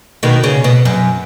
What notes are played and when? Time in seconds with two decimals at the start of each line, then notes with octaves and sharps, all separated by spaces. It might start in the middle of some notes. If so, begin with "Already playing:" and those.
0.23 B2 D#3
0.43 C#3
0.64 B2
0.85 F#2